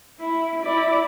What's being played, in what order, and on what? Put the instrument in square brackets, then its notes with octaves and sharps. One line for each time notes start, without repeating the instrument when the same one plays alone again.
[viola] E4
E4 D5